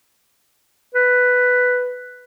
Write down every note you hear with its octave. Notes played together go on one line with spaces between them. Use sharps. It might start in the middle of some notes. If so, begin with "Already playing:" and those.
B4